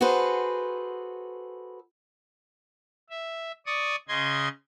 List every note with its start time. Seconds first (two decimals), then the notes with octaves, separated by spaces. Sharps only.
0.01 F#4 G#4 A4 B4 C5
3.10 E5
3.66 D5 C#6 D#6
4.08 C#3 D#5 C6 G#6